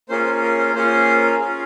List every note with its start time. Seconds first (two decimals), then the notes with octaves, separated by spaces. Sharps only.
0.09 A#3 C#4 F4 G#4 C5
0.25 C5
0.42 A#4
0.58 C5
0.74 A#3 C#4 F4 G#4 C5
1.39 C#4 F4 G#4